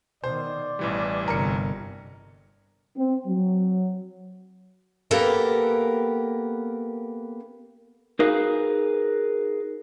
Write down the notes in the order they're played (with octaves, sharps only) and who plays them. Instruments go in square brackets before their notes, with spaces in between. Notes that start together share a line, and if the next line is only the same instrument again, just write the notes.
[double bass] B2 D#3 [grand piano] C5 [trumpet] D5
[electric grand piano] A1 E3 G3 [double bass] B2
[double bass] G1 C3 [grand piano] A#4 C#7
[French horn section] C4
F#3
[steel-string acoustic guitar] A#3 B3 G4 A4 A#4
[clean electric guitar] D#4 F#4 G#4 A#4 B4 F5